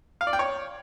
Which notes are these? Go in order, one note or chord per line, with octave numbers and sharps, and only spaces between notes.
F5
D5
G5
C#5